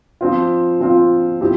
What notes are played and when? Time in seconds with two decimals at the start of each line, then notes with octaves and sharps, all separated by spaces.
0.21 F3 C4 F4
0.80 F3 C4 F4
1.41 F3 C4 E4 G4